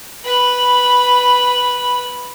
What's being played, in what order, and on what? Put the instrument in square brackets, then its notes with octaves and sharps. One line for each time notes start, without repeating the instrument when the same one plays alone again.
[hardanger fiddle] B4 B5